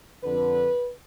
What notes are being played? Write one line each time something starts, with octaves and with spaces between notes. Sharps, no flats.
F2 D3 B4